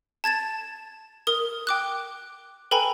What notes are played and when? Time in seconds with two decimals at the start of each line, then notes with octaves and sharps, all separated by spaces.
0.24 A5 G#6 A6 E7
1.27 A#4 D#6 G7
1.67 G5 D6 F#6
2.71 A4 B4 G5 G#5 A#5 B5